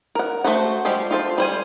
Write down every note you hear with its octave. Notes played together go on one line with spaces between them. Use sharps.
A#4 F#5
A3 F#4 A4 C5 F#5
F3 G3 G#3 G4
F4 A4 C5
G3 C5 G#5